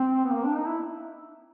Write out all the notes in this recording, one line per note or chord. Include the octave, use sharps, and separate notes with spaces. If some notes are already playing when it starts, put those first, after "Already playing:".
Already playing: C4
B3
A#3
D4
D#4
E4